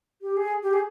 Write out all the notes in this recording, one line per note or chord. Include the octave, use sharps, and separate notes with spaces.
G4
G#4
G4
G#4